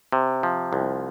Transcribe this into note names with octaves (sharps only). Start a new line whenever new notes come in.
C3
F3
C2